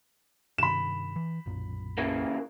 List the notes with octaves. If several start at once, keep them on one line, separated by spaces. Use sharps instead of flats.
G2 C3 D#3 B5 E7
E3
B1 F#2 A#2
C#3 E3 A#3